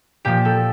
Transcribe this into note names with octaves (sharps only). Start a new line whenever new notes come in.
A#2 F3 G4
A4